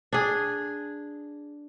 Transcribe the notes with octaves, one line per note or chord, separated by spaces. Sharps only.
D4 G#4